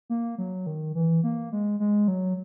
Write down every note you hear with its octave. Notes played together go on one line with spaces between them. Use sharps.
A#3
F#3
D#3
E3
A#3
G#3
G#3
F#3